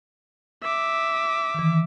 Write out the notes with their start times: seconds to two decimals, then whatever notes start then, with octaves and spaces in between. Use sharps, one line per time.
0.63 E5 D6
1.54 D#3 E3